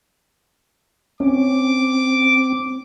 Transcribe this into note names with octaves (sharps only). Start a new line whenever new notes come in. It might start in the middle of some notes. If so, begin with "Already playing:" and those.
C4 C#4 D6